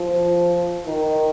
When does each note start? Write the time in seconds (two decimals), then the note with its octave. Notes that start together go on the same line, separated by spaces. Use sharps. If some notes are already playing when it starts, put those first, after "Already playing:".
Already playing: F3
0.86 D#3